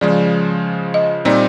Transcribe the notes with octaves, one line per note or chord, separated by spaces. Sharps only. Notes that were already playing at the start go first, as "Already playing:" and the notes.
C#3 F3 G#3 D5
D#5
A#2 G3 C4 D#4 D5